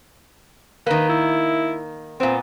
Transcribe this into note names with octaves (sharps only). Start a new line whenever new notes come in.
D#3 A#3 B4
E4
A#2 B3 C4